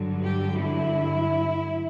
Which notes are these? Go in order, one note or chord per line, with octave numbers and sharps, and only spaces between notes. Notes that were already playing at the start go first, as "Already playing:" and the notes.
Already playing: G2 D3 F#3
G4
E4